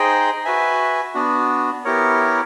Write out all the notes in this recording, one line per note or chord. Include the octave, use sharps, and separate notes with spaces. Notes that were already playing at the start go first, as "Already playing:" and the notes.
Already playing: D#4 G#4 C5 D#5 G5
F#4 B4 E5 G#5
B3 D4 F#4
B3 E4 G4 A#4 C#5